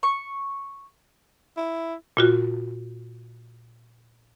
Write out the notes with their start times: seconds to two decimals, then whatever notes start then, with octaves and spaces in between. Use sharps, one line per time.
0.03 C#6
1.57 E4
2.17 A#2 F4 F#4